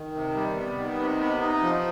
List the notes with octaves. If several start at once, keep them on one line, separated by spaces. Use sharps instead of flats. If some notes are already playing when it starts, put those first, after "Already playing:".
Already playing: D#3
C3
G3
B3
D#3
C3
B3
D#4
F3